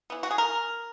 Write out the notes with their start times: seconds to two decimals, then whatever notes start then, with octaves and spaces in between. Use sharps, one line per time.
0.10 E3 B3
0.23 F#4
0.31 G#4
0.38 A#4